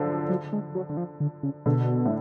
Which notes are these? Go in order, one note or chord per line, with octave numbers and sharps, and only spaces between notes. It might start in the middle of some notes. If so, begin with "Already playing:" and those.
Already playing: D3 F3 F#3
F#3
G#3
F#3
D3
F3
D3
C#3
B2 D3
A2